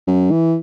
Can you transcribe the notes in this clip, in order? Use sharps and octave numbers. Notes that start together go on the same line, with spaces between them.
F#2
E3